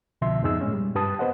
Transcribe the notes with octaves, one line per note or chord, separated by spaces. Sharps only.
C2 B2 D3 F3 E5 C6
F2 G#2 B3 D#4 G#4 E6
A#2 G#3 C#4
G3
G2 G4 B4 A5 D#6
B3 B4 C5 D#5 F#5